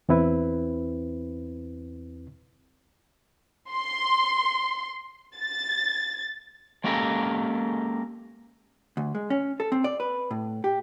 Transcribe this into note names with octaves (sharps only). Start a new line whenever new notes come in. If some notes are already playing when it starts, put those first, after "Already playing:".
E2 C4 E4 B4
C6
A6
G#3 A#3 C#4 G4 A4 A#4
D2
G#3
C#4
A4
C4
D5
B4
A2
G4